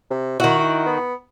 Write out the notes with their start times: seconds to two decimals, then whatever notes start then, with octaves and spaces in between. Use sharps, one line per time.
0.10 C3
0.40 D#3 E4 F#4
0.59 E4
0.86 B3